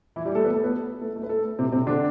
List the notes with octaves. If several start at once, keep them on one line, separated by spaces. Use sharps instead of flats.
E3 E4
G3 G4
A3 A4
B3 B4
A3 A4
B3 B4
A3 A4
A3 A4
B4
A3 A4
C3 C4
C3 C4
D3 D4